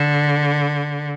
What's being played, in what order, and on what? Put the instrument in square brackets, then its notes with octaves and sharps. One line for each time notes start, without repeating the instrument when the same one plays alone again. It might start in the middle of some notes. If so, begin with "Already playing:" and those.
Already playing: [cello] D3